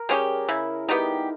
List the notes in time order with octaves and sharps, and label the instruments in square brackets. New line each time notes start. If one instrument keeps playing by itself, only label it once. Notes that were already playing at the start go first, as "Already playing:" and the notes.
Already playing: [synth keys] A#4
[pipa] G3 C#4 G4 [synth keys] G#4
[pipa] C#3 [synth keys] E4
[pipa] G3 B3 G4 [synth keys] D#4